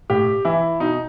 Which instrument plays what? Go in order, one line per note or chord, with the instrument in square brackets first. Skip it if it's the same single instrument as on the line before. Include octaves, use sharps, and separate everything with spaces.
[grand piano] A2 G4
E3 E4
B2 D#4